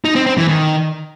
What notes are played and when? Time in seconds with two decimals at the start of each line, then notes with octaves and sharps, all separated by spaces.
0.05 D#4
0.16 C4
0.26 C4
0.37 E3
0.48 D#3